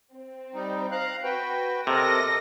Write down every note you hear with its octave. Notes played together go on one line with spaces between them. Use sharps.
C4
G3 D#4
F5 A#5 F#6
F#4 B4 G5
C3 A4 A#4 D#5 A#6